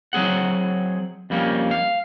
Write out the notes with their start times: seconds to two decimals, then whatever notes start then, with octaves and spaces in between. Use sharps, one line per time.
0.13 F#3 C4 G#4 F#5
1.30 F2 G3 A#3 C4 C#4
1.71 F5